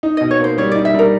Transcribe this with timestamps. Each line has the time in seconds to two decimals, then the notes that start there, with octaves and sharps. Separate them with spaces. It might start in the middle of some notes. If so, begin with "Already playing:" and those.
0.03 D#4
0.17 B2 D#5
0.31 C#5
0.40 A#3 C5
0.58 G3 C#5
0.72 D#4 D5
0.85 E5
0.94 G3 A#4